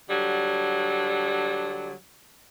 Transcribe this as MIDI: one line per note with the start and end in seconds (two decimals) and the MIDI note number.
0.09 1.92 50
0.09 1.92 54
0.09 1.92 55